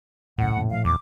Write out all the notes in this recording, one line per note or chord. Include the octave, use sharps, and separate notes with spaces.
D#1 B1 A2 C#3 F#5
F2 A#2 C#3
A#2 F3 A3 F5
E2 D6